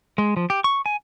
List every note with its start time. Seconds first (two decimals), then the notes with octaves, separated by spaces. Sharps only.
0.18 G#3
0.37 F3
0.50 G4
0.64 C#6
0.86 G#5